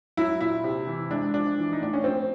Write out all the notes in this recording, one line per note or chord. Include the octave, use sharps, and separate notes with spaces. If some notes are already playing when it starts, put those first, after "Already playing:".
F#3 E4
A#2 E4
C3
E3
G#3 D4
F3 D4
E3
D#4
A2 D4
C#4
F3 C4